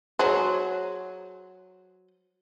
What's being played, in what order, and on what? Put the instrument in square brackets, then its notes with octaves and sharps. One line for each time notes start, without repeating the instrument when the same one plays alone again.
[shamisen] F#3 G#4 C5